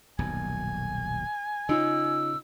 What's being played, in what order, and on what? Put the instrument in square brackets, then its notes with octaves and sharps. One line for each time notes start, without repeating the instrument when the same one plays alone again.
[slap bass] D#1 B1 F#2 [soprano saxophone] G#5
[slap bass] C#3 [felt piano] D#4 F4 [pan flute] E6